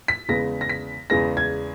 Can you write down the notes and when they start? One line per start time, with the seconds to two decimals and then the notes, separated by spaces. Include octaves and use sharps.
0.08 B6
0.29 E2 C#3 G#3 B3 A#6
0.61 A#6
0.69 B6
1.10 E2 C#3 G#3 B3 A#6
1.37 G#6